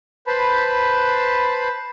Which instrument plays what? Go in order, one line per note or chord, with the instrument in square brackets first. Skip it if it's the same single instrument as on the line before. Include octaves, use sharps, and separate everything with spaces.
[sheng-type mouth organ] B4 C5 A5 B5